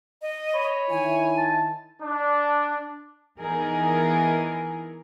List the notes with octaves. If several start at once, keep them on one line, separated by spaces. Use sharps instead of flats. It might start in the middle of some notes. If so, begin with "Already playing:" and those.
D#5
C#5 B5
D#3 E4 G#5
A5
D4
E3 B3 D#4 E4 G#4 A#4